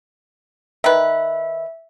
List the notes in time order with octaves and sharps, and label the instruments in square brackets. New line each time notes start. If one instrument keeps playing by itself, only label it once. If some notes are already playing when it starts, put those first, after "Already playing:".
[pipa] D#3 B4 [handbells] E5